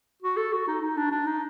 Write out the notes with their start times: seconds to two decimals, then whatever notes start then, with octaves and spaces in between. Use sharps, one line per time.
0.22 F#4
0.37 A4
0.53 F#4
0.67 D#4
0.81 D#4
0.97 D4
1.11 D4
1.26 D#4